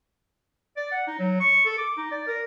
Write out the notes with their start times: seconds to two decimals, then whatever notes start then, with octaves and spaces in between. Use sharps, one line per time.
0.77 D5
0.92 F#5
1.07 D#4
1.19 F#3
1.40 C#6
1.65 A4
1.78 D6
1.97 D#4
2.11 D5
2.27 A#4